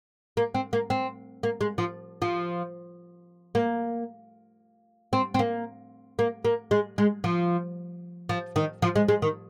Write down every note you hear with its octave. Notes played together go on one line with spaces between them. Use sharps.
A#3
C4
A#3
C4
A#3
G#3
F3
F3
A#3
C4
C4
A#3
A#3
A#3
G#3
G#3
F3
F3
D#3
F3
G#3
G#3
D#3